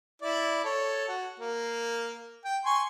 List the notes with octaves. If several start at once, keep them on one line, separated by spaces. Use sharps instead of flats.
E4 D5
A4 C#5
F#4
A#3
G5
G#5 C6 C#6